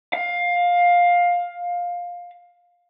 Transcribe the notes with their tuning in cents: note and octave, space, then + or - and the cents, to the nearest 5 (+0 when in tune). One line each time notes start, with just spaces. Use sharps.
F5 +15